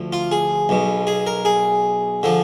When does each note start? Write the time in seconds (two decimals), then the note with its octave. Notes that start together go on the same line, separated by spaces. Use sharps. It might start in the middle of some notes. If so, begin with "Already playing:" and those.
Already playing: D2 D3 F3
0.13 F4
0.32 G#4
0.69 B1 B2
1.07 G#4
1.27 A#4
1.45 G#4
2.23 D3 F3